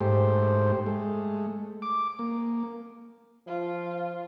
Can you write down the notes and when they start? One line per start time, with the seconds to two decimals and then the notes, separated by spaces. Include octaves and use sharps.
0.01 G#2 A3 G4 C5
0.86 G#3 A3
1.82 D6
2.19 A#3
3.47 F3 F4